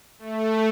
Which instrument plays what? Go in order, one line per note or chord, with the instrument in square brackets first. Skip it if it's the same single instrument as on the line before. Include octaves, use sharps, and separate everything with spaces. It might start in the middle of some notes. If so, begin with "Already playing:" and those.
[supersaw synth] A3